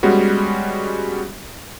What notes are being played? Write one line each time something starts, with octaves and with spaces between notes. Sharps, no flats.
G3 G#3 B3 C#4 F#4